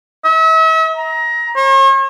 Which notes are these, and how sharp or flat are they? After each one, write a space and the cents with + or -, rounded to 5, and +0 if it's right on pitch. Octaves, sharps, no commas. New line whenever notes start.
E5 -40
A#5 +20
C#5 -45